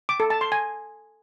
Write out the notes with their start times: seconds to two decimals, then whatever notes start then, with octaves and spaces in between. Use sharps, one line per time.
0.09 D6
0.20 A4
0.30 A5
0.41 C6
0.52 G#5